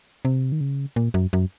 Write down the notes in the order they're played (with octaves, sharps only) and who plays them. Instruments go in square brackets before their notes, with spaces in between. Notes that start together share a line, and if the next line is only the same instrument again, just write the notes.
[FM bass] C3
D#3
C#3
A#2
F#2
F#2